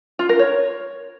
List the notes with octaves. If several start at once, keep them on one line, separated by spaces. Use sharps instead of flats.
F4
A#4
C#5